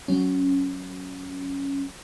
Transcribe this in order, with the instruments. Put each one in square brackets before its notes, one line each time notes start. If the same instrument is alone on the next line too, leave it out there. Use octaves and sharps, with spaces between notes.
[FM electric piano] F#3 C#4